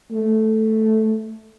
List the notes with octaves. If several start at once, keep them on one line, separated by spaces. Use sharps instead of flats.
A3